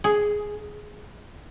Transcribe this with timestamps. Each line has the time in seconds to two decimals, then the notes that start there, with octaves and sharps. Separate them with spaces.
0.04 G#4